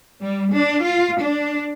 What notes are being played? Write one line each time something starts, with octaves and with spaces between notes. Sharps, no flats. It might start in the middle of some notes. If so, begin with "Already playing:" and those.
G3
D4
F4
D4